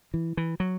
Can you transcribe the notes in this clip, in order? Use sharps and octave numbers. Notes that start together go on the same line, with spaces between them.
E3
E3
F#3